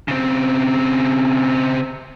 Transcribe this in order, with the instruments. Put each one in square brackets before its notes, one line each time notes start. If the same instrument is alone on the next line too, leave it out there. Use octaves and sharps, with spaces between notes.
[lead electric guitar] C#3 C4